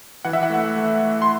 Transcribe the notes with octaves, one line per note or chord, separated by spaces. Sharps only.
E3 F#5
E5
F#5
A3
A3
A3
C6